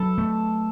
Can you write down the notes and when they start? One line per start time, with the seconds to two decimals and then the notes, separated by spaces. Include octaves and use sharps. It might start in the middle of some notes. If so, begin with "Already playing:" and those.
Already playing: F#3 D4 A4 B4
0.18 A3